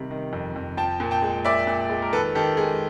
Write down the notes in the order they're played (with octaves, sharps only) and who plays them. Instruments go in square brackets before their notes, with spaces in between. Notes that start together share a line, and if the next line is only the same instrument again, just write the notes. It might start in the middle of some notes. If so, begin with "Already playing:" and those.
Already playing: [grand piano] C3 D#3 G3
D#3
F2
F2
F3 G5 A5
A#2
G5 A5
G#3
A#2 D5 E5
A#2
G#3
A#4
D#3 A4 B4
D#3 G4 A4
G#3 G#4